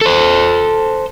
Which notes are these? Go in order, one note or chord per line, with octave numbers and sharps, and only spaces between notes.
A4 C5